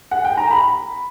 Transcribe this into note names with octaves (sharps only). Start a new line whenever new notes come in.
F#5
G5
A#5
B5